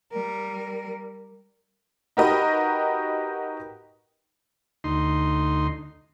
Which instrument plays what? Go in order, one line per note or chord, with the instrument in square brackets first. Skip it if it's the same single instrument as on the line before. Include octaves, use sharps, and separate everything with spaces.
[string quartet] G3 A#4
[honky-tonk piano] D#4 F#4 G4 A#4 B4 D#5
[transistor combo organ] D2 D#4 C6